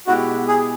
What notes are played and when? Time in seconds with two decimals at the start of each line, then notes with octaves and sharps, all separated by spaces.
0.07 B2 G#3 B3 E4 F#4 G4
0.48 G#4